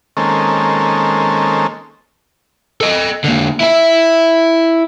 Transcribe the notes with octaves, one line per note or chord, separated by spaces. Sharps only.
D#3 G#3 A#3 C4 C#4 A4
A4 D#5
D3 A#3
E4 E5